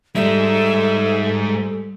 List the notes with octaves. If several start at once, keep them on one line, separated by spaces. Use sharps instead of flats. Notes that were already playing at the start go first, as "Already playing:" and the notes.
G#2 G3 D#4 A4 E5